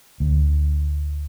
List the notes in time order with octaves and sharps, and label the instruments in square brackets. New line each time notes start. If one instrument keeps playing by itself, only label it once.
[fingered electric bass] D2